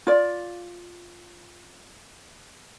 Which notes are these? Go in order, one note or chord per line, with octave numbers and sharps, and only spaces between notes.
F4 D5